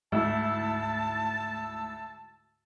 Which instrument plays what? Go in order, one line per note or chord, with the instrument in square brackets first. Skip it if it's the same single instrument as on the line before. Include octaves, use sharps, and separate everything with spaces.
[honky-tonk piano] D2 E4 [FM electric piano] G#2 E6 [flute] A5